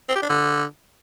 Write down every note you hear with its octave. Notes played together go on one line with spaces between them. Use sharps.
C4
G4
D4
D3